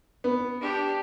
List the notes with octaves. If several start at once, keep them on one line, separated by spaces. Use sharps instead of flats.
B3
D4 G4